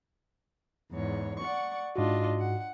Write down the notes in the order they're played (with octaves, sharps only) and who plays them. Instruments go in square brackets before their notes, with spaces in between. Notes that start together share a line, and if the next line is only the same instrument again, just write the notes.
[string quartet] E2 G#2 C#5
D5 F#5 C#6
[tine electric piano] G#2 F#4 [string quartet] D4 F4 D#5
[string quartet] F#5